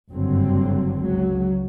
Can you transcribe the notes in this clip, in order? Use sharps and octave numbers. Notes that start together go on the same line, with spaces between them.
F#1 G2 D3 F#3 C4
C#2 F#3